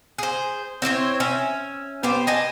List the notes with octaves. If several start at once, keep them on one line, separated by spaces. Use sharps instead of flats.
G#4 C5
C4 E4 C5 C#5
C#4 E5
B3 G4 C5
D#5 G#5 A5